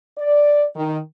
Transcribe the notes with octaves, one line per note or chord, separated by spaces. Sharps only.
D5
D#3